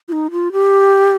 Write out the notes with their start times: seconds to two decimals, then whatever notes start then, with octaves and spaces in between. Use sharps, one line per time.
0.08 F4
0.12 D#4
0.31 F4
0.52 G4